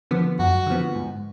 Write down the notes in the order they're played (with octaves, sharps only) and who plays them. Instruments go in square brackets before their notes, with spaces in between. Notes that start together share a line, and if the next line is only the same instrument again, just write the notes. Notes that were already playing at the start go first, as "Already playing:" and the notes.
[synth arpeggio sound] D3 F3 B3
[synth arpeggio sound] F#2 [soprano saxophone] F#4
[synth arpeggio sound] D3 F3 B3
G#2